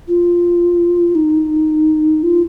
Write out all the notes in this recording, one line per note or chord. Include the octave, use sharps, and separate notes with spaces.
F4
D#4
F4